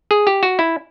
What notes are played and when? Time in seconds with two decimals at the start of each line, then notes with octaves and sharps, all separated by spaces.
0.11 G#4
0.27 G4
0.43 F#4
0.59 E4